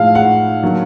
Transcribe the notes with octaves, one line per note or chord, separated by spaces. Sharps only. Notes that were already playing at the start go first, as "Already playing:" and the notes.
Already playing: A2 F3 G#3 F5
F#5
D3 F#3 A#3